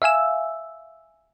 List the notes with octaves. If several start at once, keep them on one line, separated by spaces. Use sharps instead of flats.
E5 F5 G#5 E6